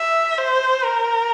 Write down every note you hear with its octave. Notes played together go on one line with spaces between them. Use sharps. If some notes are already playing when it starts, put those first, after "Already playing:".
Already playing: E5
C5
A#4